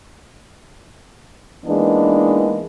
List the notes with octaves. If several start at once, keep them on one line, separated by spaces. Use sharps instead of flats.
E3 G#3 A#3 B3 D4 D#4